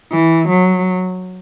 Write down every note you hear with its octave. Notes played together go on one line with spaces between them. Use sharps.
E3
F#3